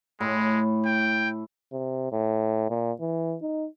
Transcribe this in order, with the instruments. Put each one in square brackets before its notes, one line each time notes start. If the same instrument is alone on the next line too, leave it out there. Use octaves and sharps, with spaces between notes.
[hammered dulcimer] A2 [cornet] G#3
[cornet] G5
[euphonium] C3
A2
A#2
E3
D#4